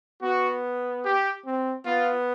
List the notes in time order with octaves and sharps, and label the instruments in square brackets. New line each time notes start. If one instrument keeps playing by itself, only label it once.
[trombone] B3 [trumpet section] F#4
[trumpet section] G4
[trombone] C4
[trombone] B3 [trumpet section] F4